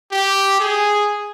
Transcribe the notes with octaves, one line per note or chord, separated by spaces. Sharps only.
G4
G#4